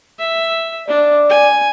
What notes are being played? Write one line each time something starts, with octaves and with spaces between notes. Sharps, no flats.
E5
D4 D5
G#5